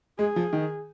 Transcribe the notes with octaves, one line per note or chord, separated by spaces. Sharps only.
G#3 G#4
F3
D#3